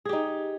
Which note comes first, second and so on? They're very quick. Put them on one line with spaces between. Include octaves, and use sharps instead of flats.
G#4 G4 D#4